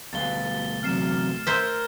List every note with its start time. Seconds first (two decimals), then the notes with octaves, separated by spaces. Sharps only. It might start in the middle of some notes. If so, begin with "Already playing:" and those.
0.13 D2 B2 G3 F5 A6 G7
0.83 E2 C3 F#3 F6 C7 E7
1.47 A#4 C5 E5 F6 G#6 G7